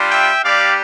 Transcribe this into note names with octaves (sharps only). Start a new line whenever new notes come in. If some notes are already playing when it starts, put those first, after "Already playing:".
Already playing: G3 D4 F4
E5 G5
G3 D4 G4 D5 F5